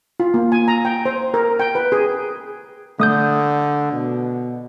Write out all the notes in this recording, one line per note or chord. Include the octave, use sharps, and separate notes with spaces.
F4
A#3
G#5
A#5
G5
C5
A#4
G5
B4
G#4
D3 A3 D#6 G6
B2